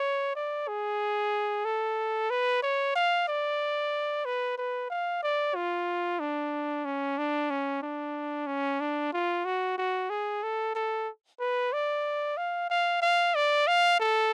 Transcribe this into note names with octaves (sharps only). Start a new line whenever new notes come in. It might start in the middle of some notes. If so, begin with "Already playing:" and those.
Already playing: C#5
D5
G#4
A4
B4
C#5
F5
D5
B4
B4
F5
D5
F4
D4
C#4
D4
C#4
D4
C#4
D4
F4
F#4
F#4
G#4
A4
A4
B4
D5
F5
F5
F5
D5
F5
A4